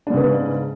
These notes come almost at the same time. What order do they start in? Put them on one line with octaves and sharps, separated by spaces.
D4 G#2 C#3 B3